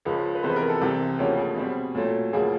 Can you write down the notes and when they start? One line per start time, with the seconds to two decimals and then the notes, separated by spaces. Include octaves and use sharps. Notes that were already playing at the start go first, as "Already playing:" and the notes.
0.05 C#2 C#3 F3 B4
0.35 B4
0.43 F2 C3 E3 G#3 B3 C5
0.50 B4
0.56 A#4
0.69 A4
0.81 C2 C3 E3
1.19 D2 C#3 F3 A#3 C#4 G4
1.38 G#4
1.56 B2 G3 C4
1.95 A#2 F#3 A3
2.33 D2 C#3 F3 A#3 G#4